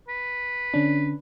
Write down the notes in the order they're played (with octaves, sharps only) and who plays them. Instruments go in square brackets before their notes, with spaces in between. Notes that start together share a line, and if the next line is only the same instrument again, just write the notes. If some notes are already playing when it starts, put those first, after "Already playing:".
[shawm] B4
[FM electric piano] D3 C#4 D4